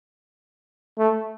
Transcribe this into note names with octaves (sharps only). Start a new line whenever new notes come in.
A3